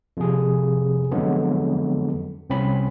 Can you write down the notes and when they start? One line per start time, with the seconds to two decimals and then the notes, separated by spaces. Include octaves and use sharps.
0.17 F2 C3 G#4
1.11 F2 D3 F#3 G#3 B3
2.50 C2 C4 C#4 B5